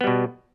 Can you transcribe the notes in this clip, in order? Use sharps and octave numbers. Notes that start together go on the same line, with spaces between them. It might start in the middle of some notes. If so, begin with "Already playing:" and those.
B2 G3 B3